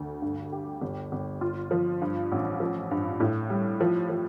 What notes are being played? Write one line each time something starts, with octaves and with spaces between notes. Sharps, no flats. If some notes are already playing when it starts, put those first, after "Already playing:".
Already playing: D2
G2
G4
G1
G1
F4
F3
G2
A1
F3
G2
A2
G3
F3
F3